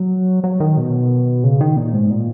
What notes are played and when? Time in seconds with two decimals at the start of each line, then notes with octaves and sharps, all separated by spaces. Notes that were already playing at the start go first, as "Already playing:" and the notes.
Already playing: F#3
0.44 F#3
0.60 D#3
0.77 B2
1.44 C#3
1.61 D#3
1.77 A#2
1.93 G#2
2.10 A#2